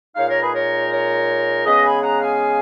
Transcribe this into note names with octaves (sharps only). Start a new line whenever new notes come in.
A#2 G#3 D#4 C#5 F5
A#4 C#5
G#4 B4
A#4 C#5
A#4 C#5
C#3 G#3 B3 B4 D#5
G#5 B5
F#5 A#5
F5 G#5